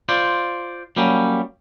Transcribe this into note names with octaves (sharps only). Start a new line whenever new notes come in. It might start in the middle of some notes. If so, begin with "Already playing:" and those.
F4 C5 D5
F#3 G3 A#3 C#4